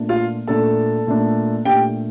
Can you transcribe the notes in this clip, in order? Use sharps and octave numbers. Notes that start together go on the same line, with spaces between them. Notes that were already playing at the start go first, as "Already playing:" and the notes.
Already playing: A#2 A3 D4
F4 F5
A#2 A3 D4 A4 A5
A#2 A3 D4
A#2 A3 D4 G4 G5